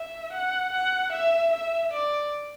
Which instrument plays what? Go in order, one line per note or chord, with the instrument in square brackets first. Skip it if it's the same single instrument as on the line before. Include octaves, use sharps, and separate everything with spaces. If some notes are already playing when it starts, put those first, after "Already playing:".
Already playing: [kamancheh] E5
F#5
F#5
E5
E5
D5